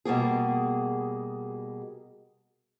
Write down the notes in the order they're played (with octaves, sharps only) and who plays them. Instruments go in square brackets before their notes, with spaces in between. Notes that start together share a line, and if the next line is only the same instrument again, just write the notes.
[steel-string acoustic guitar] B2 G3 A#3 G#4